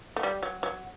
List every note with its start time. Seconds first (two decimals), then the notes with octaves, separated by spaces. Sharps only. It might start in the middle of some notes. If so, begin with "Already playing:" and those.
0.16 A3
0.23 G3
0.43 F#3
0.63 F#3